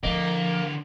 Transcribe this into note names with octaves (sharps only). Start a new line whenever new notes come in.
D3 F3 A#3 D#5